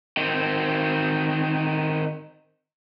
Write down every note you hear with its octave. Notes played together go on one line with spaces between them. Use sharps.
D#3 C4